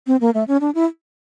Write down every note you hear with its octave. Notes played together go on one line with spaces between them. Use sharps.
C4
A#3
A3
C#4
D4
E4